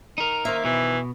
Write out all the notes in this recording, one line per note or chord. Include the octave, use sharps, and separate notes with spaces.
D#4 A#4
D#3 A#3 C5 E5
B2 E3